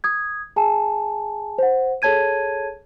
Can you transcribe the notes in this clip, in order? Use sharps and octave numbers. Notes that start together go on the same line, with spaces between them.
D#6 G#6
G#4 G#5 A5
C5 F#5
G#4 A4 C#5 A5 G#6 D#7